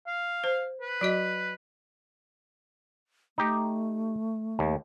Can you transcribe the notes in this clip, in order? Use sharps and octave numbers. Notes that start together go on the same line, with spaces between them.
F5
C5
B4
F#3 F#4 D#5
A3 D#4 G4
D#2